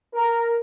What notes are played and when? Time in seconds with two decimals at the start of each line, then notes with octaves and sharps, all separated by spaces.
0.14 A#4